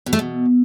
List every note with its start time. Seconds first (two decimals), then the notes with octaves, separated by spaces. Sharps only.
0.06 B2
0.13 A3
0.19 B2